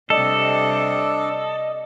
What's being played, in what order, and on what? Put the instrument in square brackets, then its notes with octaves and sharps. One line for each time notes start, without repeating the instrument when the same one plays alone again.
[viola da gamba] C3 G3 [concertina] D4 D5 [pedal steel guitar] A4 [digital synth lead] D#5